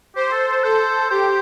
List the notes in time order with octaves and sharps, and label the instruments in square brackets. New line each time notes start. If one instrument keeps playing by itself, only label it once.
[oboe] G4 [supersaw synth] C5
[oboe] A4
A4
[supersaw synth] A4 [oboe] C5
[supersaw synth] G4 [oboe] C5